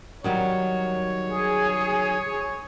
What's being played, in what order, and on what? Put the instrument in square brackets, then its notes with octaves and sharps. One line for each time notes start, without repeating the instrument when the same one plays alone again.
[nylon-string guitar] D#3 F#3 G3 [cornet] C#5
[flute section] G#4